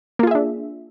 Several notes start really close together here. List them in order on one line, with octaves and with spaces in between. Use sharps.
A#3 F4 G#4 E5 D4